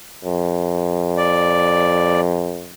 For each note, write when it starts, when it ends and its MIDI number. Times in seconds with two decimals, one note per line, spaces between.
0.25 2.74 41
1.17 2.21 74